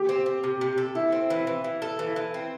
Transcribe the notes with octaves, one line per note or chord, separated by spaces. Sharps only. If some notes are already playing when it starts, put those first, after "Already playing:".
Already playing: G4
C4
C4
C3
C3
A4
E4 A4
C4
E3
E3
E3
A4
E3
E3
C4